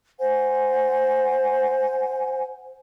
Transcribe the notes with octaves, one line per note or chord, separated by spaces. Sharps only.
C5 F#5 G#5